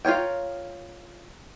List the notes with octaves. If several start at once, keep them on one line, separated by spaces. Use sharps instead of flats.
F4 A#4 C#5 G5